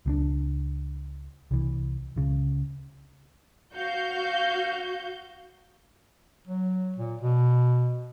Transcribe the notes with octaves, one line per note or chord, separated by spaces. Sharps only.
C#2 G#3 D4
C2 E3
C#2 C#3
F#4 F5 G6
F#3
A#2
B2